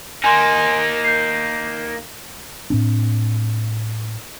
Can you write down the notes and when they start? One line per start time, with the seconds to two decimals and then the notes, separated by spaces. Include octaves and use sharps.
0.24 A#3 D#4 G#5 C6
1.04 G6 C7
2.70 A2 C4 D4